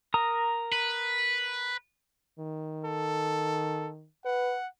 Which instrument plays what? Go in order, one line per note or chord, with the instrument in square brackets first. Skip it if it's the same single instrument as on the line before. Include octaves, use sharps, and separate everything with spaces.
[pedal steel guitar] A#4 A#5 D#6
[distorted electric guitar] B4
[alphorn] D#3
[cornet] A4
[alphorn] B4 [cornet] F#5